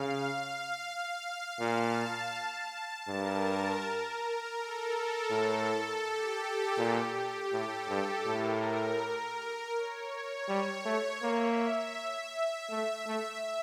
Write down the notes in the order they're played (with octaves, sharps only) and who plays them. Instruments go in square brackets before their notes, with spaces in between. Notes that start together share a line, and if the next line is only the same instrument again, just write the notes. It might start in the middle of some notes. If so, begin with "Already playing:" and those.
Already playing: [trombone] C#3 [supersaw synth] F5
[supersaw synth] F5
[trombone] A#2 [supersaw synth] A5
[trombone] G2 [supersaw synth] A#4
[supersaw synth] A4
[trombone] A2 [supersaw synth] A4
[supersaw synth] G4
[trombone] A#2
[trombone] A2 [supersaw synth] A4
[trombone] G2
[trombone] A2 [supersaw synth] A#4
[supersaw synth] C#5
C#5
[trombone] G3
[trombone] A3 [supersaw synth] C#5
[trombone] A#3 [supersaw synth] E5
[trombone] A3
A3